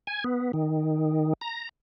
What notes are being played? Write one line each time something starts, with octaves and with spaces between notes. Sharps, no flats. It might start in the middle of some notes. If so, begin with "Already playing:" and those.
G#5
B3
D#3
A#5